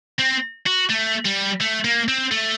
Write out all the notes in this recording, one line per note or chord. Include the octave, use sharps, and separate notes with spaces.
C4
F#4
A3
G3
A3
A#3
C4
A3